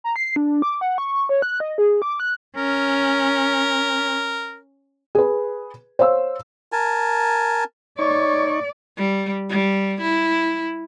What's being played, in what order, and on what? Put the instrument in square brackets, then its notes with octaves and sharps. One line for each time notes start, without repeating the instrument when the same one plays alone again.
[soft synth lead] A#5
C7
D4
D6
F#5
C#6
C#5
F#6
D#5
G#4
D6
F#6
[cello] C#4 [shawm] A#4
[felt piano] G#4 B4
C5 C#5 F5 E6
[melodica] A#4 G#5 A5
[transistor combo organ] D#4 C#6 [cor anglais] C#5 [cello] D5
[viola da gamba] G3
G3
E4